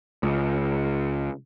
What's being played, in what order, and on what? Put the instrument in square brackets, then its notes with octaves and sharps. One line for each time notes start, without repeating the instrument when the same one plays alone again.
[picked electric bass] C#2